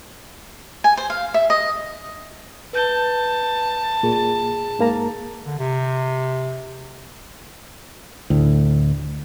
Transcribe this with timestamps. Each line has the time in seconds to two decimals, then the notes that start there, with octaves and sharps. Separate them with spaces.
0.84 G#5
0.97 C5
1.10 F5
1.34 E5
1.50 D#5
2.73 B4 A5 G6 G7
4.03 A#2 G#4
4.79 G#2 A#3 A#5
5.46 D3
5.59 C3
8.30 D2 A2